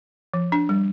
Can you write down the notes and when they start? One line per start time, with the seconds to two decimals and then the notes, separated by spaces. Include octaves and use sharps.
0.34 F3
0.52 D4
0.69 G3